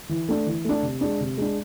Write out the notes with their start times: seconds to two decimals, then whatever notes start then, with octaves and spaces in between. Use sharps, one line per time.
0.09 E3
0.29 A3 D4
0.47 E3
0.65 A3 D4
0.83 C3
1.01 G#3 D4
1.20 C3
1.38 G#3 D4